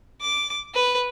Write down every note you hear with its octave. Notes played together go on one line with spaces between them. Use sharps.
D6
B4